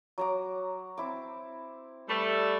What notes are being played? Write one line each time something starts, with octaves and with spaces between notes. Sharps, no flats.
F#3 A#5 D6
C4 E4 D6
G3 A3 B4